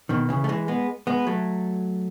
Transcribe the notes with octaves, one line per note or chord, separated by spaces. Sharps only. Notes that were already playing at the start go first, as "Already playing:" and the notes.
B2 D#3
C#3 E3
A3
E3 G#3
G#3 B3
G#3 B3
F#3 A3